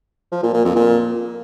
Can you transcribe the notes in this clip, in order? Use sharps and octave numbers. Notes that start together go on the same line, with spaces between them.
F3
A#2
A#2
F2
A#2